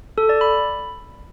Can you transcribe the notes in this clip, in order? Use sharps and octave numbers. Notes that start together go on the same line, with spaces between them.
A4
D5
B5